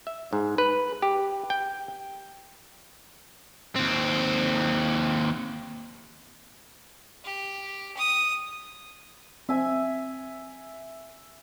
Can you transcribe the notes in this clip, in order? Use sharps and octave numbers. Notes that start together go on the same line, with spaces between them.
E5
G#2
B4
G4
G5
D#2 C4
G4
D#6
C4 E5 G#5